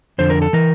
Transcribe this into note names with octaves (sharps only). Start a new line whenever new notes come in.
F2 D3 C5
A#4
A4
E3 A#4